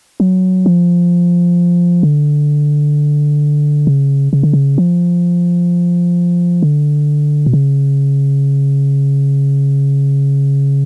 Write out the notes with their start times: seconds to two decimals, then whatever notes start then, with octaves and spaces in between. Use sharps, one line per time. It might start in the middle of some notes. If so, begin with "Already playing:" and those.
0.20 F#3
0.66 F3
2.03 D3
3.87 C#3
4.33 C#3
4.43 D3
4.53 C#3
4.78 F3
6.63 D3
7.46 B2
7.53 C#3